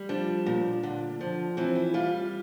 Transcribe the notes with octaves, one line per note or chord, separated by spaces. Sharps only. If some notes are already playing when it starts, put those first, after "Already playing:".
Already playing: G3
F3 D4
A#2
D3
F3
E3 C4
E4
G3 F4